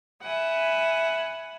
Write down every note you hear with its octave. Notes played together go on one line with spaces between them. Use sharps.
E5 F#5 G#5 B5